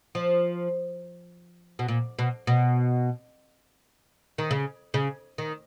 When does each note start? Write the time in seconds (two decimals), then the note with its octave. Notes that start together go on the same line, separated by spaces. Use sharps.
0.15 F3
1.79 B2
1.88 A#2
2.19 B2
2.47 B2
4.38 D#3
4.51 C#3
4.94 C#3
5.38 D#3